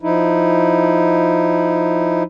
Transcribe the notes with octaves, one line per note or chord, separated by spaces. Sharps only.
F3 D#4 E4